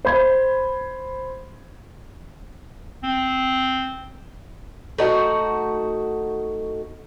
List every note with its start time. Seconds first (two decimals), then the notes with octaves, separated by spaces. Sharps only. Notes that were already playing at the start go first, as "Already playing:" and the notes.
0.05 C5 B5 G#6
3.03 C4
4.98 A3 D#4 F#4 F#5